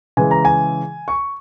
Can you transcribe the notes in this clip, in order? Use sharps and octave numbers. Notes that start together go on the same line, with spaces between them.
C#3 E3 G#3 G#5
A#5
G#5
C#6